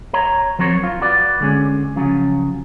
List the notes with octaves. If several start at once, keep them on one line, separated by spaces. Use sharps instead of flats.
C#5 A#5
F3 F#3 C4 A#4 C#5
F4
F#4 B4 D5
D3 G#3 C#4
C#3 F3 F#3 C#4